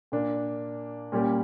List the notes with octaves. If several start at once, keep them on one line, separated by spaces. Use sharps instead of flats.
A#2 A#3 D4
A#2 G3 A#3 C#4 G4